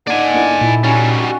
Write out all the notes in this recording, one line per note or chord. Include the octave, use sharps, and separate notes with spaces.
D3 A#3 D#4 D5 F#5 G#5
A#3 D4 E4
A#2 E4
F#3 G3 C#4
F#4